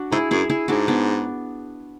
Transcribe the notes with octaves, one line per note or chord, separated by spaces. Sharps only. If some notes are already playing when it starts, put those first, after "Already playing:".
Already playing: D4 F#4
G#2 E4 G#4
F#2 E4 G#4
E4 G#4
G#2 D4 F#4
B3 D4